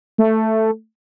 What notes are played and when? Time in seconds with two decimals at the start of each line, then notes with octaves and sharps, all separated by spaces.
0.18 A3